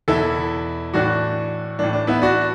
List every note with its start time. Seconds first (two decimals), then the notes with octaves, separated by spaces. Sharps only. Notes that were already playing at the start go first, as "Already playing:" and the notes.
0.08 E2 B2 E4 A4
0.94 A2 E3 D4 F#4
1.79 A2 E3 D4
1.93 D4
2.07 B3 E4
2.22 D4 F#4